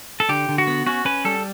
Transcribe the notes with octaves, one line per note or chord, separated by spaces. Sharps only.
A4
D3 G4
D3
F#4
B3
C#4 F#4
C#4 B4
G3 A4